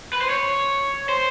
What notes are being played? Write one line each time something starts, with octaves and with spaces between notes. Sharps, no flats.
B4
C5
C#5
C5